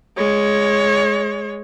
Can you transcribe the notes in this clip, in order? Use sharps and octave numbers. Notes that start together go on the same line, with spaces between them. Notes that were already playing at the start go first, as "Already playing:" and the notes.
G#3 C#5